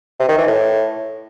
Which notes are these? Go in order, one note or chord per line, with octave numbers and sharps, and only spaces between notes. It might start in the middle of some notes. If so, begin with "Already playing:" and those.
C3
D#3
E3
A2